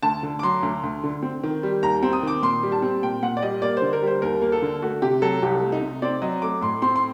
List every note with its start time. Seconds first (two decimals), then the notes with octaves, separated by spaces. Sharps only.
0.03 D2 A5
0.23 D3
0.39 D6
0.43 F#3 C6
0.63 D2
0.83 D2
1.03 D3
1.23 C4
1.43 D#3
1.63 G3
1.83 D#2 A#5
2.03 C4
2.13 D#6
2.23 D#3 D6
2.42 A#2 C6
2.63 G3
2.72 A5
2.82 C4
3.03 A#2 G5
3.23 A#2 F#5
3.37 D5
3.42 G3 D#5
3.62 A#3 D5
3.77 C5
3.82 D3
3.93 A#4
4.02 G3 C5
4.22 D#2 A#4
4.42 A#3
4.52 A4
4.62 D3
4.82 A3 F#4
5.02 C3 G4
5.22 F#3 A4
5.42 C2 G4
5.62 A3
5.72 D#4
5.82 C3
6.02 C4 D5
6.22 F#3 D#5
6.42 A3 D6
6.61 A2 C6
6.82 C4 C6
6.96 C6